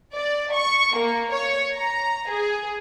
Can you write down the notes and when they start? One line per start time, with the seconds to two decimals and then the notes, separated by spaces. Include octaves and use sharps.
0.14 D5
0.52 C#6
0.95 A#3
1.31 C#5
1.75 A#5
2.29 G#4